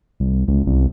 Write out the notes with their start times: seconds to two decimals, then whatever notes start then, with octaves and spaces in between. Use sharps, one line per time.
0.20 C2
0.48 C#2
0.67 C2